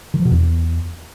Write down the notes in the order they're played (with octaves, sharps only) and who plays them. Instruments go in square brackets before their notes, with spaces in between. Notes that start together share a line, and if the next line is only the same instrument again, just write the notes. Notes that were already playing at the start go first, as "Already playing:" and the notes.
[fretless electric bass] D#3
F3
B2
E2